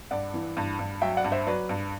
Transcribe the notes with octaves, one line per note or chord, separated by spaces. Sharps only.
G2 D5 F#5
E3
G2
G2
F#3 E5 G5
D5 F#5
G2
C5 E5
F#3 B4 D5
G2